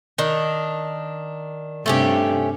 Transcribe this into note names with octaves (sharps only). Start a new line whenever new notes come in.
D#3 D4
G2 C3 A3 C#4 G4